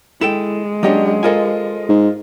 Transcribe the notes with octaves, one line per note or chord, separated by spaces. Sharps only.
G#3 E4 A4 G5 E7
F#3 A#3 C#4 D4 G4 D#5
F4 A4 A#4 C5 D#5 G#5
G#2